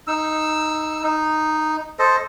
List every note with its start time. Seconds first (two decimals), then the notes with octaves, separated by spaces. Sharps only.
0.07 D#4 E6
1.03 D#4
1.99 A4 C5 D#5